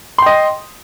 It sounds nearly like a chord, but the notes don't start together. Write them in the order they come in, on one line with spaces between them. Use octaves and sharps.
C6 G5 D#5